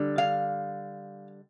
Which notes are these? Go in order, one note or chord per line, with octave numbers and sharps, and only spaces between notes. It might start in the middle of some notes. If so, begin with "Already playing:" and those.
Already playing: D3 G3
F5